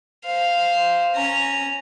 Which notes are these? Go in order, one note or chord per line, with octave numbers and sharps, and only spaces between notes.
C5 F5
C#4 A#5